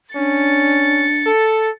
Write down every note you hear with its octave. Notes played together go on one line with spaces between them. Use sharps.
C#4 D4 A6 C#7
A4